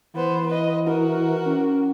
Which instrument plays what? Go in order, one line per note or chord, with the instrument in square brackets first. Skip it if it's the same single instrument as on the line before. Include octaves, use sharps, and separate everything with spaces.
[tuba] E3 [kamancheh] B3 C5
[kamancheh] B4 D#5
[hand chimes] E4 [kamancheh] F#4 A#4
[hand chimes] C#4